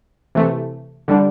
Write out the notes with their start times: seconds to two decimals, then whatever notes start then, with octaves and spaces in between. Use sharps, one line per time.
0.35 C3 E3 A3
1.08 D3 G3 D4